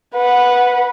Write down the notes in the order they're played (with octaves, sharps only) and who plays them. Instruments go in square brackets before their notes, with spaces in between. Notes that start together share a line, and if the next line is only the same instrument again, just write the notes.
[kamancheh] B4 F#5